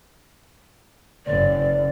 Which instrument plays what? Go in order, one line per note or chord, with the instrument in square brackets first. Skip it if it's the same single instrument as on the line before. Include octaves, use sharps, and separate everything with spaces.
[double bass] F#1 F#2 [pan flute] D5